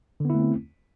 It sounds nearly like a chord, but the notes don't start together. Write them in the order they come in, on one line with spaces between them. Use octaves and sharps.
D3 B3 E4 A3 C4